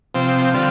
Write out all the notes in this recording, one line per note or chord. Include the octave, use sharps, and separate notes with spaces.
C3 F3 C4
D3 G3 C4 F4